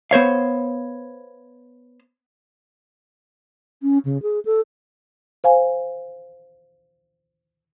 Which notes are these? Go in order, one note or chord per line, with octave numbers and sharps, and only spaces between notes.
B3 C5 C#5 F5
C#4
C#3
G#4
A4
C5 F5 G#5